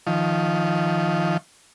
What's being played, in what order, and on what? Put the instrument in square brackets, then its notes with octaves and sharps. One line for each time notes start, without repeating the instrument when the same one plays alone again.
[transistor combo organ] D#3 F3